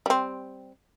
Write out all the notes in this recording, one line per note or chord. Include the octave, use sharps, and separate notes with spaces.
G3 C4